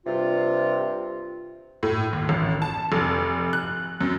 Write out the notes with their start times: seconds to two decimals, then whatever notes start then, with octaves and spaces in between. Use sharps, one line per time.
0.07 G2 C3 F4
1.83 A2
2.13 D#2
2.29 A1
2.62 A5
2.92 F1
3.53 F#6
4.01 F#2